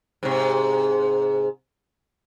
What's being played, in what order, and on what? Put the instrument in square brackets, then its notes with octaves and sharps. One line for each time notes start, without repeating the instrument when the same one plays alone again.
[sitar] G#2 C3